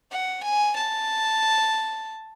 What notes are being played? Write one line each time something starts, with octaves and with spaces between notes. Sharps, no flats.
F#5
G#5
A5